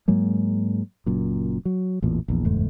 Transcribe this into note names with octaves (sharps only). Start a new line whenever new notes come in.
G#2 F#3 G#3 A#3
F#1 F#2 A#2
F#3
A1 E2 A#2
A#1 E2
F#1 E2 G#2 A3